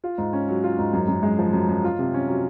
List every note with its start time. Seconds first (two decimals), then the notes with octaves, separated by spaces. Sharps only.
0.04 F4
0.18 G#2
0.33 C#4
0.48 F#3
0.64 F4
0.78 G#2
0.93 F#2
1.08 F#2
1.23 G#3
1.39 F3
1.53 F#2
1.69 F#2
1.84 F4
1.99 C3
2.14 C#4
2.28 F#3